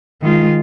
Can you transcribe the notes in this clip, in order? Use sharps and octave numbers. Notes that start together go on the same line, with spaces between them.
D#3 G#3 F4